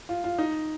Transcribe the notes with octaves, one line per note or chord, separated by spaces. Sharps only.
F4
F4
D#4